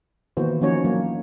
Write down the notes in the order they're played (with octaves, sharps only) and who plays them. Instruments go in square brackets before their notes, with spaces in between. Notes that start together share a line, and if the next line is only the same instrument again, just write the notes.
[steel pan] D#3 E3 A#3 B3 F#4 C5
F3 A#3 C#4 D#4 F#4 C#5
E3 F#3 A#3 D4